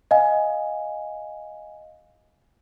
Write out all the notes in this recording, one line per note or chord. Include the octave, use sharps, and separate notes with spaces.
D#5 F5 G#5